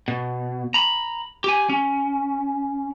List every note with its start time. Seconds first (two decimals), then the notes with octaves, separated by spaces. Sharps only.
0.08 B2
0.74 A#5 B5
1.44 G4 G#5
1.69 C#4